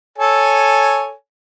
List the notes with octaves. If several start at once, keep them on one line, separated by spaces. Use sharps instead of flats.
A4 C#5 G#5